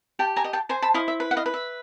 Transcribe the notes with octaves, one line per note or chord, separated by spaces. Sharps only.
G4 G5 A5
G#5 A#5
D#5
G5 A5
C5 G#5 A#5
A5 B5
E4 D#5 F5
E5
B4
F#5
D#5 F5
B4
E5